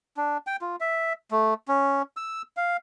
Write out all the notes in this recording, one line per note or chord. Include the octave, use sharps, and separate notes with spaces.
D4
G5
F4
E5
A3
C#4
E6
F5